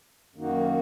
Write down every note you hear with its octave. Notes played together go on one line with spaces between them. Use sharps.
F#2 D#3 A#3 D#4 F#4